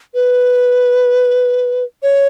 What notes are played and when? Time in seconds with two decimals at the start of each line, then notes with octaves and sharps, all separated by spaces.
0.15 B4
2.03 C#5